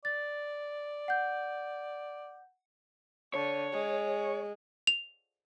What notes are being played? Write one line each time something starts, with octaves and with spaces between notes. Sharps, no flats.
D5 A6
F#5 G6
D3 C#5
G#3
F7